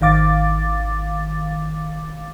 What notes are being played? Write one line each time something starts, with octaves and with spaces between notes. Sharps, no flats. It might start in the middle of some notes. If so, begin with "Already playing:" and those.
G#1 D#3 F5 D6 A6